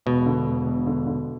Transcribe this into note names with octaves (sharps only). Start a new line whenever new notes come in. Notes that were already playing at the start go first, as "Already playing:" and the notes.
E1 B2
D3
E1
E1
D3
D3